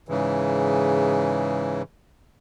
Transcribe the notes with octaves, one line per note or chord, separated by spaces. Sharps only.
G#2 C#3 E3